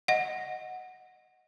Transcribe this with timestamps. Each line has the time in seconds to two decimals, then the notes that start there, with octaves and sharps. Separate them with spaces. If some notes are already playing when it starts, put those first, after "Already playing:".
0.08 D#5 F#5